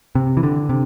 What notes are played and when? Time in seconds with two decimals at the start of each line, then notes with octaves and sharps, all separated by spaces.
0.15 C3
0.37 E3
0.43 D3
0.69 C3